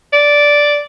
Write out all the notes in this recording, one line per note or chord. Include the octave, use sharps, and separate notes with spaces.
D5